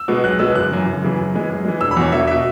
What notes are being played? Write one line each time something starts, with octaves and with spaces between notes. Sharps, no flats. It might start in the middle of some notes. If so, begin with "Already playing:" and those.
Already playing: E6
B2 G#3 B3
B1 F#6
B2 G#3 B3 E6
F#1 F#6
F#2 C#3 E3
F#1
F#2 C#3 E3
F#2
E3 G#3
F#2
E3 G#3
E1 E6
B5
E2 B2 C#5
E1 E5
B2 E5